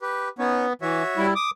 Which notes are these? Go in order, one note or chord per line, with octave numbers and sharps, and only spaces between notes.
G4 B4
B3 C#4 D#4 C#5
E3 F#4 C#5 E5
G3 E4
D6 D#6